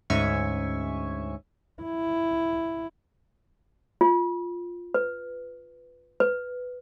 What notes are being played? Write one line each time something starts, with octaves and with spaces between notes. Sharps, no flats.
D2 G#2 C#4 E5 G#5 C#6
E4
F4
B4
B4